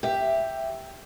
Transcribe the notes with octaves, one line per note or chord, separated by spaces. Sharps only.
G4 E5